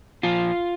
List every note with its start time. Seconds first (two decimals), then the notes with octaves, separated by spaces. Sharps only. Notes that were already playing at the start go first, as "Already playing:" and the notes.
0.23 A#2 F3 F4